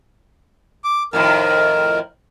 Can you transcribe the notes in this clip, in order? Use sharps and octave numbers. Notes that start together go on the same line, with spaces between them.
D6
F2 A2 D#3 A#4